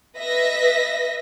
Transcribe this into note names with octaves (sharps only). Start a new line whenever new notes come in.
B4 D#5 E5 A#6 B6